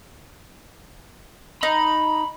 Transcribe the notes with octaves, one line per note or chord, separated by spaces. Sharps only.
D#4 B5